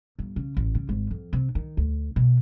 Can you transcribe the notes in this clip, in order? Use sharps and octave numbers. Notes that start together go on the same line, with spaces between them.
G1
C#3
A1
C#3
G#1
F2
C3
D#3
D2
B2